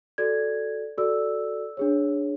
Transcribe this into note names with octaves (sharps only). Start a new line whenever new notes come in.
F#4 A4 D5 G#6
F#4 A4 D5 E6
D4 G#4 C#5